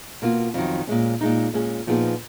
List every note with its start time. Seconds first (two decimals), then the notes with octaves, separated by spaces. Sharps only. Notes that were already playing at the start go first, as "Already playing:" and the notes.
0.22 B2 A#3 F4
0.54 F2 D#3 F#3
0.87 A#2 G#3 C#4
1.21 A#2 G#3 D#4
1.54 A#2 G#3 C#4 G#4
1.87 A#2 F3 B3 D#4 G#4